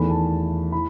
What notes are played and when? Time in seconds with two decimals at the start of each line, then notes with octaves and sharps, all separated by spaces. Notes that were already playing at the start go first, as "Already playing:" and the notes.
Already playing: E2 D#3 A3 B5
0.10 A5
0.72 E3 B5